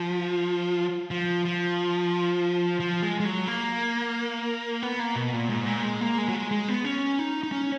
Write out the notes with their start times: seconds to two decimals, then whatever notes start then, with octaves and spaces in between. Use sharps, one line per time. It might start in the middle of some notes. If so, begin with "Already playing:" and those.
Already playing: F3
1.11 F3
1.45 F3
2.80 F3
3.02 G#3
3.20 G#3
3.25 F#3
3.47 A#3
4.83 B3
4.99 A#3
5.16 B2
5.33 A#2
5.49 G#2
5.66 A#2
5.83 G#3
6.01 A#3
6.18 G#3
6.29 F#3
6.34 G#3
6.51 G#3
6.68 B3
6.84 C#4
7.19 D#4
7.43 D#4
7.52 C#4